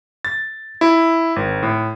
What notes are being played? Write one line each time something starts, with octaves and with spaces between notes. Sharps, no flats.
A6
E4
G#1
A2